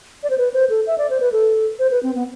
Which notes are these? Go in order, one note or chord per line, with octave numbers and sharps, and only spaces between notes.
D5
C5
B4
C5
A4
E5
D5
C5
B4
A4
C5
B4
C4
B3